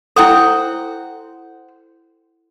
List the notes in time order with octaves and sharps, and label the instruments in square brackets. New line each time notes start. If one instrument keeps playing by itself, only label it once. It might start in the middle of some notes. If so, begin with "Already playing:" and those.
[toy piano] E4 A4 [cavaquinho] C5 F#5 G5